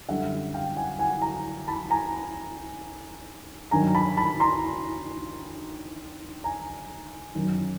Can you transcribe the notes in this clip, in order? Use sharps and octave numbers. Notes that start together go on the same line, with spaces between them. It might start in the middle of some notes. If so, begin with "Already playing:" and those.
F#2 D3 G3 E5 F#5
F5 G5
F#5 G#5
F#5 G#5
G#5 A#5
A5 B5
G#5 A#5
G2 D#3 F#3 G#5 A#5
A5 B5
A5 B5
A#5 C6
G#5 A#5
F#2 D#3 F#3